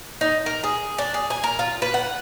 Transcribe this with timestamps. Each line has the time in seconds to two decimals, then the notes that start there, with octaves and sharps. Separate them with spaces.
0.21 D#4
0.46 A#4
0.64 G#4
0.98 D4
1.14 G#4
1.30 G#5
1.44 A#4
1.59 F4
1.82 B4
1.94 F#5